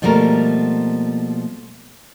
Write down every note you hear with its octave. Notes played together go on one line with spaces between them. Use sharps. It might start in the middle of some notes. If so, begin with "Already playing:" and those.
B2 F3 G3 A3 A#3 A#4